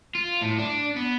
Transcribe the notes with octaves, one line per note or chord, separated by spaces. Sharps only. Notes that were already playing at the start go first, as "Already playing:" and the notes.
F4
A2
D4
B3